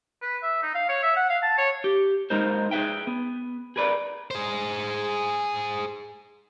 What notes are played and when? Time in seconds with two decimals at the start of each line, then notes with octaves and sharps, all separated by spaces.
0.22 B4
0.43 E5
0.63 D#4
0.75 F5
0.89 C#5
1.03 E5
1.16 F#5
1.30 F5
1.42 A5
1.58 C#5
1.84 G4
2.30 G#3 A#3 D#4 A#4 C5
2.71 G#4 A4 B4 E5 G5
3.07 B3
3.76 G#4 A#4 B4 D5
4.31 G#4 C5